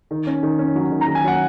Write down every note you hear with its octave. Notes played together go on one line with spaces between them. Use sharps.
D#3
C#4
D#3
C#4
F#3
D#3
A#5
D#3
G#5
F#3 F#5